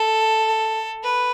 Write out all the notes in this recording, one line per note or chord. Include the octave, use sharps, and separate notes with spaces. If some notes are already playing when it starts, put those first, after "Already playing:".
Already playing: A4
B4